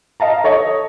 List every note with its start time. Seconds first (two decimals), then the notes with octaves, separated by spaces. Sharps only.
0.20 D#5 F5 A5 A#5
0.44 A4 C#5 D#5